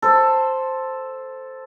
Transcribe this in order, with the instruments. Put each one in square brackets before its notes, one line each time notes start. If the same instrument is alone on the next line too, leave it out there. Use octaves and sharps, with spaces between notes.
[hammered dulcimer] A4 C5